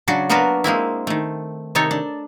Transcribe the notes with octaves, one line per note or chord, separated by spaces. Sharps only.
C#3 F#3 D4 F#4
A#3 B3 D4 F#4 A#4 B4
G#3 A#3 C4 E4
D#3 A3
C3 D#3 D#4 A4 C#5 A5
D4